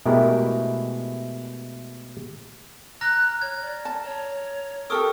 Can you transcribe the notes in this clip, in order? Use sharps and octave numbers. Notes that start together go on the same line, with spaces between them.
B2 G#3 A3 E4 G4 A#4
A#5 F6 F#6 A#6
C#5 G#6
D5
A5
C#5
G4 A4 A#4 C#6 D#6 E6